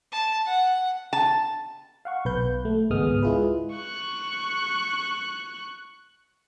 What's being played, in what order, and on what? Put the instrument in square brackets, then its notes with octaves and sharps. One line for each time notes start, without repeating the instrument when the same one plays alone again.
[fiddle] A5
F#5
[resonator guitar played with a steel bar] A5
[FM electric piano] F5 F#5 C#6
B1 B4 G6
A3
G#1 C#2 G#3 B3 D#6 F6
G#3 E4 F4 G#4 B4
[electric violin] C#6 F#6